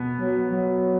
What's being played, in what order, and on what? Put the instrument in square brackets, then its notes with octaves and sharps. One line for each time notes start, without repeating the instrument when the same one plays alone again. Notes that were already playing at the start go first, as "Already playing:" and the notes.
Already playing: [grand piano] B2 B3
[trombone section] F#3
F#3